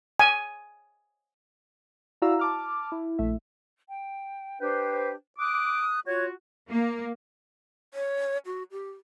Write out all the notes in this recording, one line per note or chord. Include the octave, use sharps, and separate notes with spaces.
G#5
E4 F#4 D5 F5 A#5 E6
A5 D6 F6
E4
A#1 A3 E5
G5
D4 G4 B4 C5 G5
D6 D#6 F#6
F4 F#4 C#5 G#6
A#3
C#5
F#4
G4